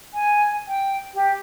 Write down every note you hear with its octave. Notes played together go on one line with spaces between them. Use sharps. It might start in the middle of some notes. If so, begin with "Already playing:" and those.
G#5
G5
G4